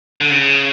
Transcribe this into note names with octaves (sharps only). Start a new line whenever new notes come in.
D3
C#3